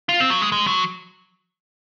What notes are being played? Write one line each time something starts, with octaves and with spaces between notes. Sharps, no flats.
F4
C4
F#3
G#3
G#3
F#3